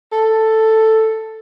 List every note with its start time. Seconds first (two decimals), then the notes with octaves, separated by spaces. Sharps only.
0.12 A4